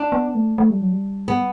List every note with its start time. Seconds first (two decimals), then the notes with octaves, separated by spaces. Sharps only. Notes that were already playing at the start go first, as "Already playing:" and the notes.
Already playing: D4
0.12 B3
0.35 A3
0.58 A3
0.70 G3
0.80 F#3
0.92 G3
1.28 B3